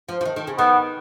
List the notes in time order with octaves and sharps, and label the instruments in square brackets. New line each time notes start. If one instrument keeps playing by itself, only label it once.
[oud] F3
F3
D#3
D#3
C#3
[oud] D#3 [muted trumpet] B3